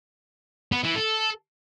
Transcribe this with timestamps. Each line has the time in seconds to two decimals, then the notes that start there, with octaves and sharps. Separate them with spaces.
0.72 B3
0.84 E3
0.96 A4